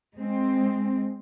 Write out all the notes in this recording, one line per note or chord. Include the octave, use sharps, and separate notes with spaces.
G#3 C4